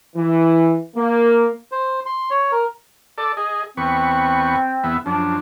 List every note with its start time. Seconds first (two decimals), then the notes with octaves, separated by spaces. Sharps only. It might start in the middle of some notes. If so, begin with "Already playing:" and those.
0.16 E3
0.96 A#3
1.72 C5
2.06 C6
2.30 C#5
2.52 A#4
3.18 A4 D5
3.37 G#4 D#5
3.77 E2 C4 B4 C#6
4.84 E2 B3 E5
5.06 F#2 F3 D4